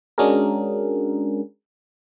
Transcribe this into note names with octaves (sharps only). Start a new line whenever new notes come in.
G#3 C#4 D4 F#4 G#4 A#4